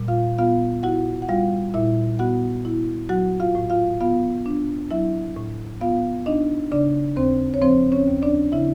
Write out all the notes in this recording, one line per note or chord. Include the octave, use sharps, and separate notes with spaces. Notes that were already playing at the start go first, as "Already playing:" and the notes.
Already playing: A#2 G3
F4 F5
B3 F4 F5
E4 F#4 F#5
F#5
G3 F4 F5
A#2 E4 E5
B3 F#4 F#5
E4
F#3 F#4 F#5
F4 F5
A2
F4 F5
B3 F4 F5
D4
F#3 E4 E5
A2
B3 F4 F5
D4 D#4 D#5
C#3 D4 D5
D#2 C4 C5
C#5
F3 C4 C5
C#4 C#5
D#2
D4 D5
C#3 E4 E5